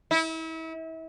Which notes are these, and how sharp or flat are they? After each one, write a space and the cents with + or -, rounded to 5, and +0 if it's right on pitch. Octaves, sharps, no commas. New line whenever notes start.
E4 -35